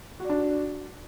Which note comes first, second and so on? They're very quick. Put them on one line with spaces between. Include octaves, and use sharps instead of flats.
F#4 D5 D4